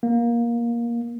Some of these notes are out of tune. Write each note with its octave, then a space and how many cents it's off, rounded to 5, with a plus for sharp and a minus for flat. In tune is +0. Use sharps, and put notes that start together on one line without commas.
A#3 +15